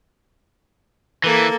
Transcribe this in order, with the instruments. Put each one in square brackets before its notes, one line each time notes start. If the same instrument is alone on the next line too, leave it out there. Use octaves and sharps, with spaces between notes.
[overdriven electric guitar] E3 [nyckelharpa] A#3 A4